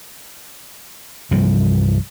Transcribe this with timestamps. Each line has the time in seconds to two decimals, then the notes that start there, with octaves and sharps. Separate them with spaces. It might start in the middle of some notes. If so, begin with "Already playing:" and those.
1.31 C2 G2 E3 F3